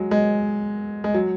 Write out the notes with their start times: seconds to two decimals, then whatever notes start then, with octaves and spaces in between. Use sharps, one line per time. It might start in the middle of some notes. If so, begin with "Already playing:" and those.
Already playing: F#3 G#3
0.11 G#3
1.04 G#3
1.14 F#3